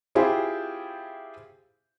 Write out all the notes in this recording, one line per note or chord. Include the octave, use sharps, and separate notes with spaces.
C4 E4 F4 G4 G#4 C5